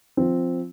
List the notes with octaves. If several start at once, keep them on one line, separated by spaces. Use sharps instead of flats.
F3 C4